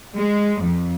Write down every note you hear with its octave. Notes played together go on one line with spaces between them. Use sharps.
G#3
F2